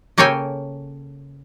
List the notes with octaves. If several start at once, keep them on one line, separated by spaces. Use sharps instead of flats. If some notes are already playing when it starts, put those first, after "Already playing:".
C#3 A#3 A4 C#5 G5 G#5